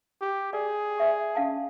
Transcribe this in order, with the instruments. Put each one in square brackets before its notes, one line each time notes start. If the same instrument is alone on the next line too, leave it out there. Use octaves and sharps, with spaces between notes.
[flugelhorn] G4
[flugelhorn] G#4 [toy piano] D5
[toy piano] D5 E5 C#6
C#4 F5 A5